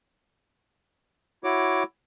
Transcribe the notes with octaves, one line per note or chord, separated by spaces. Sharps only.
E4 F#4 C#5 D6